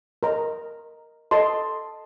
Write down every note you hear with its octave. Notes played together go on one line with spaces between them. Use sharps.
A#4 D#5 A#5
A4 D#5 A5 C6